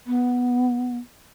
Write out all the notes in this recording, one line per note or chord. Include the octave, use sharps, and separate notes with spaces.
B3